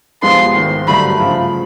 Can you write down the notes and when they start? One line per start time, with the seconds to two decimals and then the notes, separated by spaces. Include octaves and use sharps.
0.23 C2 A#2 F3 G#3 B3 C6
0.55 G#1 G#2 D#3
0.87 G2 D3 F#3 A3 B5
1.20 C#3 F3